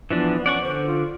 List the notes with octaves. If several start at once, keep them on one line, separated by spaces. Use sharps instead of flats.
E3 F3 B3 D4
C#4 D5 F#5 C#6
D3 C5
F4